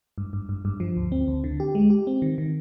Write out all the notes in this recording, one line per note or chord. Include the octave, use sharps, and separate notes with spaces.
G2
G2
G2
G2
F3
D2
C4
D2
D3
G4
G#3
G4
C4
D#3
D#3